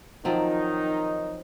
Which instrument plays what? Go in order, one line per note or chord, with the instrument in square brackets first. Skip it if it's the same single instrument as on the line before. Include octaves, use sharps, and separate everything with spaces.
[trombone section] D#3 D#4 [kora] F3 F#3 C4